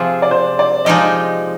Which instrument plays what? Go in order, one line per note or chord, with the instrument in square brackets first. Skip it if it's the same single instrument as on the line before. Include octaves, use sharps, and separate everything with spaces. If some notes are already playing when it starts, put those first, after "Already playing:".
Already playing: [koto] C3 F3 C4 F4 G#4
[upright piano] D5
C5
D5
[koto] F3 G#3 D#4 G4 [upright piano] D#5